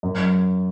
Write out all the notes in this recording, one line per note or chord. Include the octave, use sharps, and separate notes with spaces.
F#2